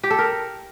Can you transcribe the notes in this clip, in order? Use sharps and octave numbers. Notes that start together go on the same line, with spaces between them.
G4
A4
A#4